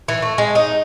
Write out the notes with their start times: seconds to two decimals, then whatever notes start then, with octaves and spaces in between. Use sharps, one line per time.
0.08 E3
0.22 A3
0.38 G#3
0.55 D#4